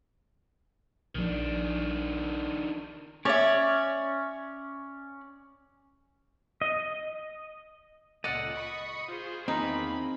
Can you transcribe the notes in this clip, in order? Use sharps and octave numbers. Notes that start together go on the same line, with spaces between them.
A#1 D#3 F3 D4
C#4 C#5 D5 E5
D#5
C#2 A#2 A4 D5 D#5 F#5
B5 C#6 D#6 C#7
F4 G#4 C5
E2 D#3 A#3 C4 D#4 G#4 B5